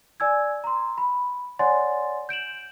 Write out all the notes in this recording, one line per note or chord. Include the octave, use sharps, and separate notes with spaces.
D5 G#5 E6 G#6
A#5 C6
B5
C#5 D5 F#5 G#5 C6 A6
G6 D7 E7 F#7